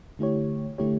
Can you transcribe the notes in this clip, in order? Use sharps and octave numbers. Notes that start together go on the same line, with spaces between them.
D3 A3 E4 G4 C#5
D3 A3 E4 G4 C#5